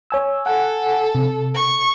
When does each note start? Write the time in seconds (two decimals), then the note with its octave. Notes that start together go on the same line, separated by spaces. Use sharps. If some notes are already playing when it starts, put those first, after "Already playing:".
0.10 C#5 G#5 E6
0.46 A4 F#5 G#5
1.15 C3
1.55 C#6